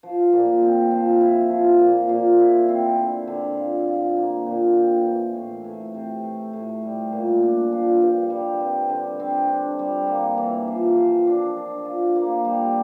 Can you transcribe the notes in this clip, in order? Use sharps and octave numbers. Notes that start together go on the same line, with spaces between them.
F3
A#2
C4
F3
E4
F3
A#2
A#2
E4
C4
D3
D3
F4
F4
A#3
A#2
C4
E3
A2
A2
C3
A3
A2
G3
A#2
D4
F3
G2
G3
C4
D3
C4
D4
G3
A#3
E3
F3
F3
D4
D4
F4
A#3
G3